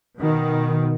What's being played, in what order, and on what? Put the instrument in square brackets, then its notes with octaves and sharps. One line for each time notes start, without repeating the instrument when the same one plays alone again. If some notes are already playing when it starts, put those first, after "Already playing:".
[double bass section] B2 D#3